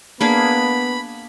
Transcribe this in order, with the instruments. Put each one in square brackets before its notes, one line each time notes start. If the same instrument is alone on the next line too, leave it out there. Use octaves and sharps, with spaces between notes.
[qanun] A#3 D4 G#4 [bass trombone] B3 [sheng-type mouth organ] B5